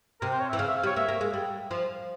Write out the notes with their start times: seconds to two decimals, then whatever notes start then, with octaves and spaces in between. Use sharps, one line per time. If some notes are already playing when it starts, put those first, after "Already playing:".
0.21 C3 A#4
0.32 C5
0.40 C#5
0.49 E5
0.53 E3
0.59 C#3 F5
0.68 E5
0.77 F5
0.83 G3
0.86 C#5
0.96 A#3 E5
1.08 A#3
1.21 G#3
1.34 G3
1.71 F3